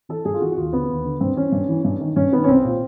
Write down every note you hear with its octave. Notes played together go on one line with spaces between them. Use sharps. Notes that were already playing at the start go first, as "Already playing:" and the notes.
E3 A4
G2 G#4
F4
E3 F#4
F#4
D#2 F4
D3 B3
D#2
D3
G2 C4
E3 C#4
G2
E3
G2
D#3
G2 C#4
D#3 B3
C#4
C2 C4
A#2